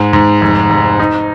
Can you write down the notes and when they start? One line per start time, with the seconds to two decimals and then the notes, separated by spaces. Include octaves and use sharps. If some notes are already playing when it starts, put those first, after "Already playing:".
Already playing: G#2
0.13 G#2
0.41 F1
0.70 F1
0.99 D#4